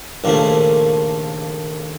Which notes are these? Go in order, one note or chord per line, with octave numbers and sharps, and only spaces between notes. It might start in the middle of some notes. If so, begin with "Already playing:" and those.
A#1 D#2 A#2 C#3 F3 A3